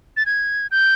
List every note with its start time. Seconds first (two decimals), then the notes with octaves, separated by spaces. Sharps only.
0.17 A6
0.26 G#6
0.71 G6